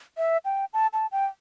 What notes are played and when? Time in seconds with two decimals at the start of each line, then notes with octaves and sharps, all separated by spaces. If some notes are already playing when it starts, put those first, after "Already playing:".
0.17 E5
0.45 G5
0.74 A5
0.93 A5
1.12 G5